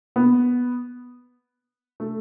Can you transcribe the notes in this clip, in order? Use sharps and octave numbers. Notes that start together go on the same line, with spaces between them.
B3
A3